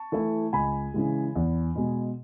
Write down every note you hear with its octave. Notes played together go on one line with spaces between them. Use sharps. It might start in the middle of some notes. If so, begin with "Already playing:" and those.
Already playing: A5 C#6
E3 A3 E4
C#2 G#5 B5
C#3 E3 G#3
E2
B2 G#3